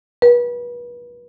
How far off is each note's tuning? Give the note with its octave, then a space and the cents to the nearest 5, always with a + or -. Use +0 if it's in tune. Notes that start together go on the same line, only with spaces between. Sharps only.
B4 -35